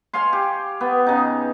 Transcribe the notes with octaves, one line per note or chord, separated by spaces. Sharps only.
C#5 F5 G#5 C6
G4
B3
C#3 D#4